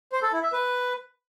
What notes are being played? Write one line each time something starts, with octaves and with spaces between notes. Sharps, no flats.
C5
A4
E4
E5
B4